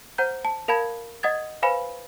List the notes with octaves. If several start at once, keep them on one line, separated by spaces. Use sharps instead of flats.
C5 F#5 A#5 G6
A5
A#4 F5 A5 B5 G#6
D#5 F#5 D#6 G#6 A6
B4 C5 F5 G#5 B5